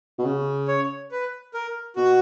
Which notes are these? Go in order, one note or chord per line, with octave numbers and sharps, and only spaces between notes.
B2
C#3
C#5
B4
A#4
B2 F#4